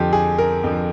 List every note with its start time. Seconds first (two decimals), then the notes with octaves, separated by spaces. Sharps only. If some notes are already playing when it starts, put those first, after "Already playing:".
Already playing: F2 D3 F3 G4
0.13 G#4
0.38 A#4
0.64 F2 D3 F3